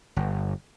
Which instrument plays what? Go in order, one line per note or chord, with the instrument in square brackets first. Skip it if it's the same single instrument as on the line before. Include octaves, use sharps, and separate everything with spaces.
[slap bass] G1